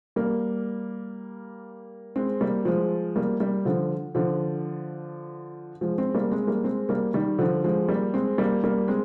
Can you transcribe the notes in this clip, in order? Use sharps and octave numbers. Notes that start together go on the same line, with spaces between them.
G3 A#3
G#3 C4
G3 A#3
F3 G#3
G3 A#3
G3 A#3
D3 F3
D3 F3
F3 G#3
G#3 C4
G3 A#3
G#3 C4
G3 A#3
G#3 C4
G3 A#3
D#3 G3
D3 F3
F3 G#3
G3 A#3
G#3 C4
G3 A#3
G3 A#3
G#3 C4